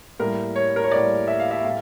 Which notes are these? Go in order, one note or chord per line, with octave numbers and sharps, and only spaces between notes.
A2 G3 A#3 A#4
C#5
A#4
C#5
A2 G3 A#3 D5
E5
F5
E5
A2 F5